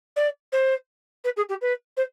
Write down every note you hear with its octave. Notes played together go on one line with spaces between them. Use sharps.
D5
C5
B4
G#4
G4
B4
C5